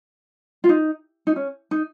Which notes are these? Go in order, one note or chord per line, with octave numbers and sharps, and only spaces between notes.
F4
D#4
D#4
C#4
D#4